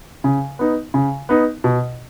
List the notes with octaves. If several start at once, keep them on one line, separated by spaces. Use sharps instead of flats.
C#3
B3 D#4
C#3
B3 D#4
B2